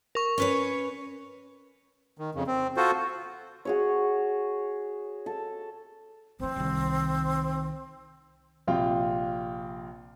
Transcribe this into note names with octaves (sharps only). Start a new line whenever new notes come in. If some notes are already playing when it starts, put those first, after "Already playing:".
A#4 C#6
C#4 B4 C#5
D#3
F2 C#3
C4
F4 F#4 A4 C5
F#4 G#4 C#5
A4
D#3 E3 C4
C2 D#3
A#1 C3 F4 G5